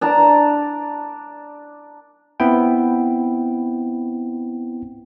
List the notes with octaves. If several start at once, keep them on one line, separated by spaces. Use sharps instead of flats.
D4 A5 A#5
B3 C4 E4 G5